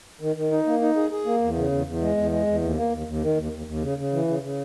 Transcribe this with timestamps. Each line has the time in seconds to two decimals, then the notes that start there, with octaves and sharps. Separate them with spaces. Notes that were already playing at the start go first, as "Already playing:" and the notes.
0.21 D#3
0.36 D#3
0.51 D#4
0.67 A#3
0.82 D#4
0.96 G#4
1.12 G#4
1.26 A#3
1.42 E2
1.57 C#3
1.71 E2
1.86 E2
2.02 G#3
2.17 E2
2.31 G#3
2.47 E2
2.62 D#2
2.77 A#3
2.92 D#2
3.07 D#2
3.22 D#3
3.37 D#2
3.52 D#2
3.67 D#2
3.82 C#3
3.98 C#3
4.13 E3
4.28 C#3
4.43 C#3